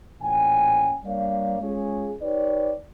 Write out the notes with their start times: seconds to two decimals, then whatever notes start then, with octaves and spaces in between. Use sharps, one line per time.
0.21 A1 A#2 C#4 G5 G#5
1.04 G3 A#3 D4 C#5 D5 F5
1.60 G#3 C#4 F4 G#4
2.21 D#4 G4 B4 C#5 D5